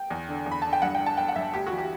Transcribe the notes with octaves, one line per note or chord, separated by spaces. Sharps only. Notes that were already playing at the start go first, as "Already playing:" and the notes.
Already playing: G5
E2
D3
E2
B5
D3 A5
G5
G2 F#5
G5
G2
A5
G1 G5
F#5
G2 E5
D2 G4
F#4
E3
G4